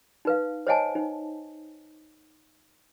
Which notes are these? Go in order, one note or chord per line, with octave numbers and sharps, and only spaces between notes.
D#4 B4 F5
C5 C#5 D#5 F#5 G#5 A5
D#4